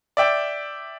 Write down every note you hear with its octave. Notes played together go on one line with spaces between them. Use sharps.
D5 E5 G5